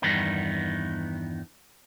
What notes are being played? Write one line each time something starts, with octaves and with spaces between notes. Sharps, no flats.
E2 G2 D#3 B3 D#4